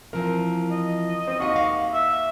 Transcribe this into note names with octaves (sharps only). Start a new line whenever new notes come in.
E3 F3 C4 A#4
D#5
C4
D#2 F#4 D#5
F5
E5